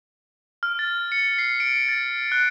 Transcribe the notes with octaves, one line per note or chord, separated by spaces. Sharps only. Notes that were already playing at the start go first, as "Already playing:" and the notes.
F6
A6
C#7
C7
D7
A6
F#6